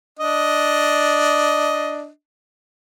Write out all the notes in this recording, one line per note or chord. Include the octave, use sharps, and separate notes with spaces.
D4 D#5